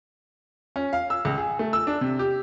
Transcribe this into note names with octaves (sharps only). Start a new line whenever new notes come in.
C#4
F5
E6
C#2
G#4
A3
E6
D4
C3
G4